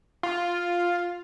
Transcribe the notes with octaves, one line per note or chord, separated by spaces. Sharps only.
F4